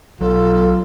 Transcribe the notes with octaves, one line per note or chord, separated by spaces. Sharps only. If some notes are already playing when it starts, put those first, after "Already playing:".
B1 F#3 F4 A4